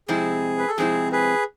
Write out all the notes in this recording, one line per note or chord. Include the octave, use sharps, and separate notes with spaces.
F2 C3 G#3 C4 E4 G#4
B4
A4
F2 C3 G#3 C4 E4 G#4
G#4 B4